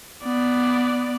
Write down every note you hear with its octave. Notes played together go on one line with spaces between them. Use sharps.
B3 D5